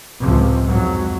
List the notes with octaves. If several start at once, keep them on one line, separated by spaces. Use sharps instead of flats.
C#2 A2 C3 F3
F2 G#2 F#3